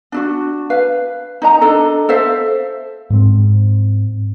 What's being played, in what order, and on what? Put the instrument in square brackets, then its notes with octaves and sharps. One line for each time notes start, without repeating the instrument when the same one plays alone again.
[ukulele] D4 E4 F#4
B4 F5
D#4 D#5 A#5
D4 A4 D#5
A4 C5 E5 F5
[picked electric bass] G#2 C4